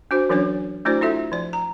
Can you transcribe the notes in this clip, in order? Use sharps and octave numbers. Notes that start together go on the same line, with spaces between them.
D4 F#4 C5
E3 F#3 C#4 D4 C#5
A3 D4 E4 F#4 C5 D5
E4 F4 A4 E5
F3 D5
A#5